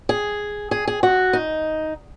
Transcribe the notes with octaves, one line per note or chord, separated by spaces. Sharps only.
G#4
G#4
G#4
F#4
D#4